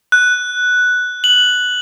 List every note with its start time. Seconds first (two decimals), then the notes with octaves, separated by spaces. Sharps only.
0.12 F#6
1.24 F#7